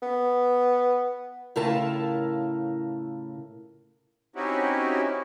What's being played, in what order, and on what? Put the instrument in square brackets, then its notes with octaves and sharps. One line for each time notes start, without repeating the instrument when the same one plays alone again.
[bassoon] B3
[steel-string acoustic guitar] A2 C#3 E4 F4 A#4 A5
[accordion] C4 C#4 D#4 E4 F#4 G4